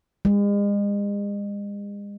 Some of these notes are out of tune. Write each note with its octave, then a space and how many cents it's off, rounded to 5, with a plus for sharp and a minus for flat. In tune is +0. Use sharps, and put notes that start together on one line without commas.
G#3 -40